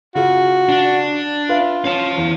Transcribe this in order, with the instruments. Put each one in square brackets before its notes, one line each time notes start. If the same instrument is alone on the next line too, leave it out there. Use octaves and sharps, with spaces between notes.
[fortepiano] C#3 F4 G#4 [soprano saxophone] F#4
[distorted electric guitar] D4
[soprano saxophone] F4 [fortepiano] B4 E5 F5
[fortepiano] C#4 [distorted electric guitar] F5 A5
[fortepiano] E2